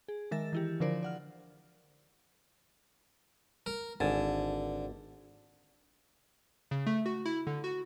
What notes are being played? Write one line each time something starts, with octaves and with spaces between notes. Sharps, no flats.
G#4
D#3 G#3 A#4 E5 A6 E7
E3 E4 G4
D3 F3 D4 A#4 C5 D5
D5 F#5 F6
A#4
G#1 D3 G#5 A5
C#3
A3
F#4
E4
D3
F#4